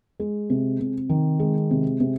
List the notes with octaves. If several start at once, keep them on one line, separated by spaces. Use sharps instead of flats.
G#3
C3
C3
D#3
G#3
C3
C3